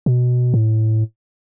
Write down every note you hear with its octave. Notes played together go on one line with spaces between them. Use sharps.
B2
A2